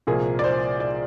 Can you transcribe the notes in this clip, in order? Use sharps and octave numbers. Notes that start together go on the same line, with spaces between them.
C2 A#2 F3 A#3 G#4
D5
C5
D5